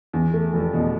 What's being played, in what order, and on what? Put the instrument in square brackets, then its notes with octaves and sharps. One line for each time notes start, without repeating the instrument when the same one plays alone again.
[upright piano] E2
A3
F1
B2